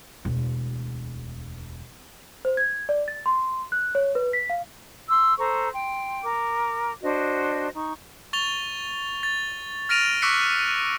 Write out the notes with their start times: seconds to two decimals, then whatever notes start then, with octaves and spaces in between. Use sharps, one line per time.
0.25 E1 D2
2.45 C5
2.57 G#6
2.89 D5
3.08 A6
3.26 C6
3.72 F#6
3.95 C#5
4.15 B4
4.33 B6
4.50 F5
5.09 C6 E6
5.38 A4 C5 A#5 C#6
5.73 G5 C6
6.23 A#4 D6
7.02 D4 F#4 C5 D#5
7.75 D#4 C#6
8.33 C#6 A6 F7 G7
9.23 A6
9.89 F6 A6 A#6 D7 D#7 F7
10.22 C#6 D6 E6 F#6 B6 C#7